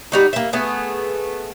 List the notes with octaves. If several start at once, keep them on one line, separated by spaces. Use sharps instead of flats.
G3 D#4 F#4
A#3 E5
A3 B3 G#4